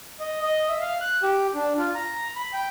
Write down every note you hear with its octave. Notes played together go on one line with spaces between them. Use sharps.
D#5
D#5
E5
F5
F#6
G4
D4
F4
A#5
B5
G5